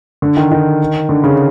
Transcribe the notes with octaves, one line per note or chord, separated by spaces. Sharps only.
D3
D#3
D#3
D3
C#3